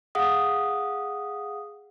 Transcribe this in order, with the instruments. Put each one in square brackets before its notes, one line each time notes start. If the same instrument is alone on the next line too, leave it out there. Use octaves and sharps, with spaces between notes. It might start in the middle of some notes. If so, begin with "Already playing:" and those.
[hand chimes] G#4 F5 F#5 D#6